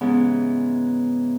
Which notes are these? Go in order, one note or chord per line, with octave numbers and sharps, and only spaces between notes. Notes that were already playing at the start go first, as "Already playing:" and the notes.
G#2 C#3 E3 B3